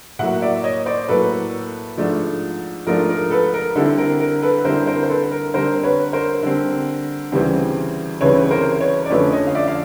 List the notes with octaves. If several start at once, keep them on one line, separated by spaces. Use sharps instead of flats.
A2 F#3 A#3 E5 F#5
D5 E5
C#5 D#5
C5 D5
A2 F#3 A#3 A4 B4
G#2 F3 A3 D4 F4
G#2 F3 A3 D4 F4 A#4
A#4
A4 B4
A#4
D3 G3 C4 E4 A4
A#4
A#4
A4 B4
D3 G3 C4 E4 A#4 C5
A#4 C5
C5
A4 B4
A#4
D3 G3 C4 A#4 C5
B4 C#5
A#4 C5
D3 G3 C4
D2 C#3 E3 G3 C4
D2 C#3 E3 G3 C4 B4 C#5
A#4 C5
B4 C#5
D5
F2 D3 F3 A3 C#4 B4 C#5
C#5 D#5
F5
D5 E5
F5